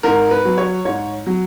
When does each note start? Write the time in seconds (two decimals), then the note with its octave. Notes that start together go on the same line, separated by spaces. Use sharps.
0.03 G#2 A#4
0.31 B4
0.45 F#3
0.58 C#5
0.85 G#2 C#5
1.27 F#3